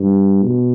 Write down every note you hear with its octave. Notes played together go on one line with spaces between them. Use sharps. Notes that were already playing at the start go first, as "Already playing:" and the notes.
Already playing: G2
B2